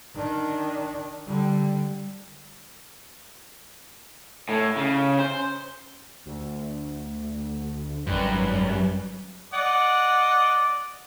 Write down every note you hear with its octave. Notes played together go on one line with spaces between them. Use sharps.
D#3 D4
D3 G3
A2
C#3
C5
D2
G#1 F#2 G3 B4
D5 D#5 F#5